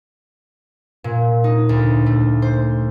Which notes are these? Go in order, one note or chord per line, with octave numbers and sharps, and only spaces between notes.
A#2
D#4
D2
A3
C5